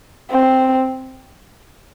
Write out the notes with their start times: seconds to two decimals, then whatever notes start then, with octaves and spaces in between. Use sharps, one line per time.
0.30 C4